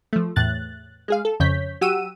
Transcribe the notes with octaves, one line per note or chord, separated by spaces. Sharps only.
F3 A3
E2 A2 F#6 A6
G#3 G#4 F5
A4
F2 C#3 C#5 G6 B6
F#3 G4 F#5 E6 D#7